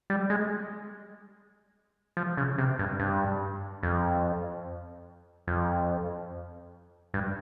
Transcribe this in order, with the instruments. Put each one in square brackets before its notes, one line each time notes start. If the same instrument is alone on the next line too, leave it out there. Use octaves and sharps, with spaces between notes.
[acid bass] G3
G#3
F3
C#3
C3
G2
G2
F2
F2
G2